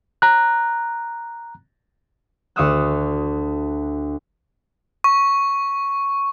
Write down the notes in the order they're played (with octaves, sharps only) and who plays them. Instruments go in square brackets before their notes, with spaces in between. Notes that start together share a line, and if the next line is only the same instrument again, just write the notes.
[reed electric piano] A#5 F#6
[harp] D2 F5 C#6 D#6 E6 F#6
[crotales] C#6